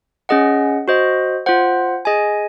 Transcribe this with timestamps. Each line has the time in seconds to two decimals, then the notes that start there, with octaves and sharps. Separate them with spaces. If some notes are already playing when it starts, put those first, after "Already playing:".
0.29 C#4 G#4 D#5 F#5
0.88 F#4 C5 D#5
1.46 F4 C5 F#5
2.05 G#4 D#5 G#5